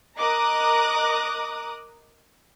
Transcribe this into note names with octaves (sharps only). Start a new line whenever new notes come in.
A#4 D#5 A#5 D6 D#6 F#6